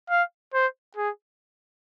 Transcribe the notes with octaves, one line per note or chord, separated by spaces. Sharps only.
F5
C5
G#4